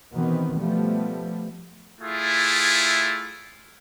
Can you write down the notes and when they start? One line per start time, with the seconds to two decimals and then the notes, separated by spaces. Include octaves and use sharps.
0.12 B2 D#3 E3 B3 C4
0.56 F3 G3 A3 B3
2.01 A3 E4 F4 G#4